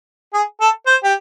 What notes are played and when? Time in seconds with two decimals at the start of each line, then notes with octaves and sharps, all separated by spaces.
0.34 G#4
0.61 A4
0.87 C5
1.04 G4